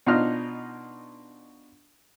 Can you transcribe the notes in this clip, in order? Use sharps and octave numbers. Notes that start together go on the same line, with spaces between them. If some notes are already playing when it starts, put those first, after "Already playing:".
B2 D4 D#4 F4 D#5 F6